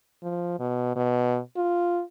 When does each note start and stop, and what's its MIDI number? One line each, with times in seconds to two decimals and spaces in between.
0.23 0.58 53
0.60 0.91 47
0.96 1.39 47
1.56 2.02 65